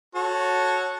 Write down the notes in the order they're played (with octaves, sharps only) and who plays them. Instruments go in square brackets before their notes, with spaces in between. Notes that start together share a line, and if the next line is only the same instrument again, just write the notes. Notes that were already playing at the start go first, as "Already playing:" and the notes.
[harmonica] F#4 A4 C#5